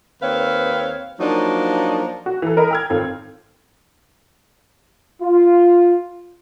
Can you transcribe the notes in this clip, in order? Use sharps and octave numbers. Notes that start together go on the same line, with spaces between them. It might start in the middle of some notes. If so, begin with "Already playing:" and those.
D#2 C4 B4 C#5 F5
F3 F#3 A#3 D4 D#4
F#4
E3 A4
A4 A#4 D#5 A#5 B5
G5 F6 G#6
G#1 C4 F4 A4
F4